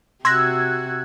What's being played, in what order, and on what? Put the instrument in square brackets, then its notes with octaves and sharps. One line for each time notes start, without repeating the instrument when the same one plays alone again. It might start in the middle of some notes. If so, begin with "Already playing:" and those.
[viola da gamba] C3 F#4 [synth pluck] C6 A#6 [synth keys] E6 F#6 G#6